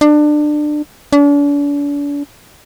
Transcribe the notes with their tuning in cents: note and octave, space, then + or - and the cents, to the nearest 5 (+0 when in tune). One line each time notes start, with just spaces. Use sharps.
D4 +25
D4 -40